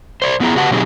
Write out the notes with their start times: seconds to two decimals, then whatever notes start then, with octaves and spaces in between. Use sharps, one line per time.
0.22 C5 D5
0.40 F#2 B3 E4 G#4 A#5
0.56 C#3 F#4 G4 B4 F#5 A5
0.71 B2 F#3 C4 D#4 G4 G#4